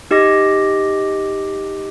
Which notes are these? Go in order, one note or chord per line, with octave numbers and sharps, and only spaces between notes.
D#4 G4 D#5 D6 A#6